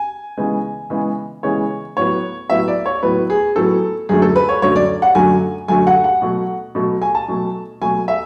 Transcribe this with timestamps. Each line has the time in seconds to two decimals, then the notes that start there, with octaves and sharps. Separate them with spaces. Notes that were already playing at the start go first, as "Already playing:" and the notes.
Already playing: G#5
0.37 C#3 E3 G#3 B3
0.90 C#3 E3 G#3 B3
1.43 C#3 E3 G#3 B3 C#5
1.97 A2 F#3 B3 C#5
2.50 A2 F#3 B3 E5
2.68 D5
2.86 C#5
3.03 A2 F#3 B3 B4
3.30 G#4
3.56 A2 F#3 B3 A4
4.09 F#2 D3 F#3 A3 G#4
4.22 A4
4.36 B4
4.49 C#5
4.62 F#2 D3 F#3 A3 C#5
4.76 D5
5.02 F#5
5.15 F#2 D3 F#3 A3 G#5
5.68 F#2 D3 F#3 A3 G#5
5.87 F#5
6.04 F#5
6.22 B2 F#3 A3
6.75 B2 F#3 A3
7.02 G#5
7.15 A5
7.28 B2 F#3 A3
7.81 B2 F#3 A3 G#5
8.08 E5